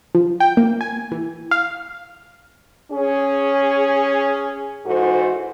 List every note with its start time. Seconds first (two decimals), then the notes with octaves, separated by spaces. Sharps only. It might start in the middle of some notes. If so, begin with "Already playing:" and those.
0.15 F3
0.40 G5
0.57 A#3
0.81 G#5
1.12 E3
1.51 F5
2.92 C#4 G#4
4.86 G#2 E3 F#4 A4 C5